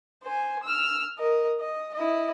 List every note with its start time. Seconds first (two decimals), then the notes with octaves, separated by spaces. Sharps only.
0.23 C5 G#5
0.64 E6 F6
1.18 A#4 D#5
1.59 D#5
1.94 E4 D#5